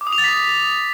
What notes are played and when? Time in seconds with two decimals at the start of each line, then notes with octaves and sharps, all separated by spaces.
0.01 D6
0.07 D#6
0.12 F7
0.18 A6
0.24 B6